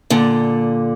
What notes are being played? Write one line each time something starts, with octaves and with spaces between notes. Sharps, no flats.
A#2 D3